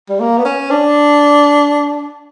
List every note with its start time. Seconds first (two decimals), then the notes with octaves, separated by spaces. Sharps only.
0.09 G3
0.20 A#3
0.38 B3
0.45 C#4
0.71 D4